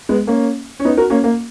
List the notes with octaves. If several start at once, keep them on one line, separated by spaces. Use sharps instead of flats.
G#3 B3
A#3 C#4
C#4
B3 D#4
F#4 A#4
A#3 C#4
A#3